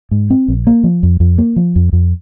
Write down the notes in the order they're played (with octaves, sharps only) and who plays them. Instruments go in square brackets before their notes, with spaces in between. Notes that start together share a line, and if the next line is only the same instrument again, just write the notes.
[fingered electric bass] G#2
C4
A#1
A#3
F3
F2
F2
A#3
F3
F2
F2